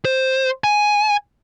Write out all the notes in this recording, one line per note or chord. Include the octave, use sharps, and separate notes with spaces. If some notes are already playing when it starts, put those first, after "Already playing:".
C5
G#5